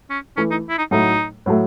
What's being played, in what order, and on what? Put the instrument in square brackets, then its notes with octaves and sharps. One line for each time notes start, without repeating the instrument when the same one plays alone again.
[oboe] C#4
[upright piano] E3 A3 E4 [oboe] C#4
[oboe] D#4
E4
D#4
[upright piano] A2 F#3 A3 [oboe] D#4
[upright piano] A2 F#3 A3